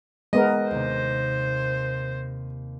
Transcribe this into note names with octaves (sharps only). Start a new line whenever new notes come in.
G#3 B3 A#4 D#5
D#2 C3 C5